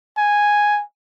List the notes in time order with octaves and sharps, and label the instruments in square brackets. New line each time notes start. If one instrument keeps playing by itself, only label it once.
[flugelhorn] G#5